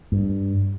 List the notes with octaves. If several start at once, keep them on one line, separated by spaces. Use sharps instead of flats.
G2